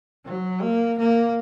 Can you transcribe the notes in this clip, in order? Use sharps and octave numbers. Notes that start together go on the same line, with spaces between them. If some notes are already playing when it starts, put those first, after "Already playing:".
F#3
A#3
A#3